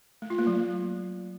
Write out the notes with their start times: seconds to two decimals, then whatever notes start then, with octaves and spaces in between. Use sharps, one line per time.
0.22 A3
0.30 F4
0.39 A#3
0.47 F#3